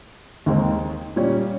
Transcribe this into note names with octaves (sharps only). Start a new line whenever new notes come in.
D#2 D#3 G#3 C4
A#2 G3 C#4